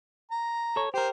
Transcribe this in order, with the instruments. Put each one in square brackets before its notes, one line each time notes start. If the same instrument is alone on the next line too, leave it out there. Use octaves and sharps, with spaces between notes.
[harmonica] A#5
[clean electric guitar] A4 C#5
[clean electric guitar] G4 A#4 [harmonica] C5